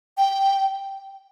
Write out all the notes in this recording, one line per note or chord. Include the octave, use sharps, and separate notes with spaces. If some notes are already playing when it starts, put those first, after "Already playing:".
G5